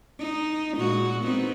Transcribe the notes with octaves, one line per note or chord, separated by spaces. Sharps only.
D#4
A#2 G#3 F#4
B3 C4 D#4